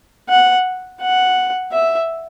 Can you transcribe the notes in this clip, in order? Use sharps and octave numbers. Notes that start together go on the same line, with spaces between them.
F#5
F#5
E5